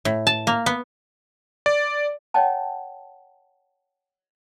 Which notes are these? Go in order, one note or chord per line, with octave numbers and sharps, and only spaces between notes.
A2
A5
A#3
B3
D5
C#5 D#5 F#5 G5 A5